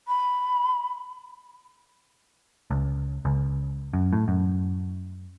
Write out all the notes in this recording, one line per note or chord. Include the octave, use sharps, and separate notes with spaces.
B5
C#2
C#2
F#2
A2
F#2